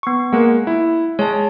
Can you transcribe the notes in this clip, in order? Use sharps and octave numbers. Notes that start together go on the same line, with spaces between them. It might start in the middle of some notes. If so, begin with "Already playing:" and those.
B3 C#6
G#3 A#3 F#5
E4
G#3 C#5 A5